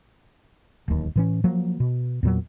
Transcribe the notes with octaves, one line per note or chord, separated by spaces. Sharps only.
D1 D#2
A2 E3 C#4
F3 F#3 A#3
B2
E2 A#2 F#3